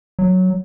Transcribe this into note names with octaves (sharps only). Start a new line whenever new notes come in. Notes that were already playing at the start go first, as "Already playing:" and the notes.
F#3